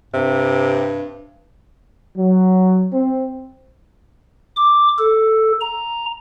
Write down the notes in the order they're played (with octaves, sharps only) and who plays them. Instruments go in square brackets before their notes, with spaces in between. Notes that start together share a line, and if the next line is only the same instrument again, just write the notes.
[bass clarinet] G2 [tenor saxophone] C3
[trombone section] F#3
C4
[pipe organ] D6
A4
A#5